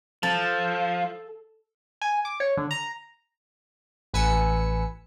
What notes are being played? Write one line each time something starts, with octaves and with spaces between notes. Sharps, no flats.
F3 A4
G#5
D6
C#5
D3
A#5
A1 B4 G#5 E6 C#7